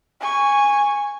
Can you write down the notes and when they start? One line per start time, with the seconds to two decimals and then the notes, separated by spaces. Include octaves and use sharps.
0.20 G#5 C#6